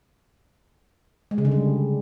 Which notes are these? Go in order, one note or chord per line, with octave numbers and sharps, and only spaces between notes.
G#3
C#3
D3
G3